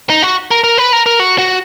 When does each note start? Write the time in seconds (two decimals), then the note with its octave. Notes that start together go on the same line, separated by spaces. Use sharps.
0.09 D#4
0.23 F#4
0.51 A#4
0.64 A#4
0.78 B4
0.93 A#4
1.06 A#4
1.20 F#4
1.38 F#4